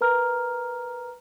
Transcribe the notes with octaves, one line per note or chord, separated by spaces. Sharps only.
A#4 B4 A#5 F6